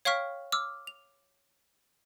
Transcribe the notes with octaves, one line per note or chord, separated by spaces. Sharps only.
C#5 F5 G5 C#6 F6 B6
D6 E6 F6
F7